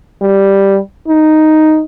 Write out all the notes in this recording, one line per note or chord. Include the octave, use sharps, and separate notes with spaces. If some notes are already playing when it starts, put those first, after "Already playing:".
G3
D#4